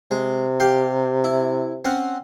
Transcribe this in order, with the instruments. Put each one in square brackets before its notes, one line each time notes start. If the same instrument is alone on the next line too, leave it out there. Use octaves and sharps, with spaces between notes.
[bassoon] C3 [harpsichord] G#3
[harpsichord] G4 F5 G5
E4
C4 C#4 F#5